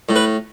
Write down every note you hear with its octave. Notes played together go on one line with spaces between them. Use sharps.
A2
B4